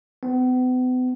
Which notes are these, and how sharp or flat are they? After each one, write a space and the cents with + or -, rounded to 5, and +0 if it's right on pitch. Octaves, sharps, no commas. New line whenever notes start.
B3 +40